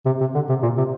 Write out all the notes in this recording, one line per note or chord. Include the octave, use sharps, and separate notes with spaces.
C3
C3
D3
C3
A#2
C3